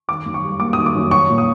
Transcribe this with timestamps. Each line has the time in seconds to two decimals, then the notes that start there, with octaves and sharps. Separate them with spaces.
0.08 D#3 D6
0.26 F#2
0.34 C#6
0.43 G3
0.60 A#3 D6
0.73 D#3 D#6
0.86 D6
0.95 F#2
1.11 F#3 C#6
1.30 A#2
1.38 D#6